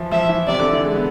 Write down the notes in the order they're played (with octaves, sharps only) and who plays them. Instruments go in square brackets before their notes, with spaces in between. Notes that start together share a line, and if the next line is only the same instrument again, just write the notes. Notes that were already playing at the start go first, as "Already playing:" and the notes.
Already playing: [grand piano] E3 F3
[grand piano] F3 [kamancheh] E5
[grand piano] E3
[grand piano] C3 [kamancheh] D5
[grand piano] D3
E3
G#3
B3